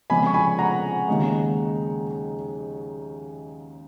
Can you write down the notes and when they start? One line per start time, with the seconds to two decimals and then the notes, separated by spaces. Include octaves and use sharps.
0.10 F1 F2 C#3 G#3 G#5 B5
0.26 C#6
0.34 G#5 B5
0.59 F#5 A#5
1.08 D#2 C#3 G#3 D#4